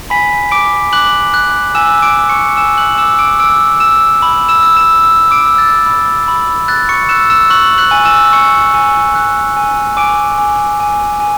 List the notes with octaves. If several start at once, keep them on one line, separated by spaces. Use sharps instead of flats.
G#5 B5 B6
D6 D7
D6 F#6 F#7
F#6
G#5 E6 E7
D6 D7
D6
C#6 C#7
G#5 E6 E7
F#6 F#7
D6 E6 E7
D6 D7
D6 E6 D7
E6 E7
B5
E6 E7
E6
E6 E7
E6
D6 D7
E6
A6
B5
B5
F#6 A6
C#6 C#7
E6 F#6 E7
E6 E7
C#6 F#6 F#7
F#6 F#7
G#5
E6 E7
C#6 C#7
G#5
F#6
G#5
G#5 D6 D7
G#5
G#5
G#5